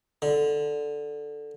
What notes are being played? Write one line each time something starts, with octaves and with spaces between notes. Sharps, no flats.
D3